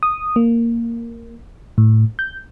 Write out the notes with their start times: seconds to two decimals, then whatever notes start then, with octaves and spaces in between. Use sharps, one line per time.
0.03 D#6
0.36 A#3
1.78 A2
2.19 G6